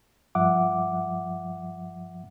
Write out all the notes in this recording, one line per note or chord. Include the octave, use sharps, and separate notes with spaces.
G2 F3 E5 F#5 D6